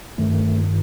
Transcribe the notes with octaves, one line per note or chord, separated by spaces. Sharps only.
G2 D#3 A3